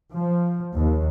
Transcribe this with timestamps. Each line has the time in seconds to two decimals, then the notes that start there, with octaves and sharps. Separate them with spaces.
0.14 F3
0.75 D#2